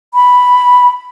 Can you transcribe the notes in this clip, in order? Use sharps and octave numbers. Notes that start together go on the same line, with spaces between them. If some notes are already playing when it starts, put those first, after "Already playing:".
B5